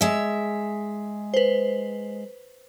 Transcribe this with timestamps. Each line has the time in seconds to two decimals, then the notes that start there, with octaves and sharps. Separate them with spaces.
0.01 G#3 E5
1.34 B4 C5